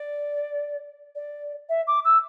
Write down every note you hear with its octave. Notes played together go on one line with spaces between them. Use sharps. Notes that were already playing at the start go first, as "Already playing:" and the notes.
Already playing: D5
D5
E5
D6
E6